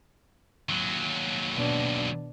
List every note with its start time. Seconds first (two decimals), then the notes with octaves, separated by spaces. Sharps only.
0.69 D#2 F#3
1.53 B2 D4